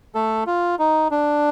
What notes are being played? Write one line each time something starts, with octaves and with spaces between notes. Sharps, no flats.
A3 A4
F4
D#4
D4